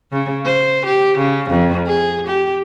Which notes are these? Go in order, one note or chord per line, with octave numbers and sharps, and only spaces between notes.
C#3
C5
G4
C#3
F2
G#4
G4